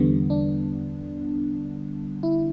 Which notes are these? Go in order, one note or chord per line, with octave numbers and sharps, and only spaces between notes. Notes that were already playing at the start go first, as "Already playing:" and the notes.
Already playing: E2 D3 G3 B3
D4
E4